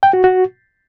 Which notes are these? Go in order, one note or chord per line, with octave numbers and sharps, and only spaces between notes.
G5
F#4
F#4